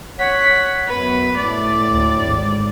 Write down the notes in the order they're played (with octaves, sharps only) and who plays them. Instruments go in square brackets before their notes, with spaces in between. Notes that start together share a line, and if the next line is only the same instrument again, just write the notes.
[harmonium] C#5 F#5 [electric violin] B6
[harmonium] F#2 [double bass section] B3 [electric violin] B4
[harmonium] A2 [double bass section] A3 [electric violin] D5
[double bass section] D2
G#1